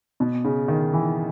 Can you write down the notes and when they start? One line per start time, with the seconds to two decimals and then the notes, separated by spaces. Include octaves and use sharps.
0.20 B2
0.44 C#3
0.68 D#3
0.93 E3